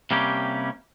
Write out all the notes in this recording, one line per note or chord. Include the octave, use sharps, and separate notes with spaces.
C3 G3 A#3 C#4 G4